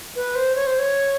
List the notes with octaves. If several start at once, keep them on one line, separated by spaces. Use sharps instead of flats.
B4
C5
C#5
C5
C#5